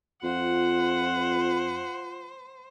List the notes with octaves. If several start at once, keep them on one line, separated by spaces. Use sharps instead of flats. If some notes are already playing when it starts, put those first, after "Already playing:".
F2 F4 C5 F#5